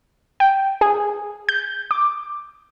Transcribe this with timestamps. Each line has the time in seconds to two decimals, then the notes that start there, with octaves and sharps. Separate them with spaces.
0.40 G5
0.81 G#4
1.49 G6
1.91 D6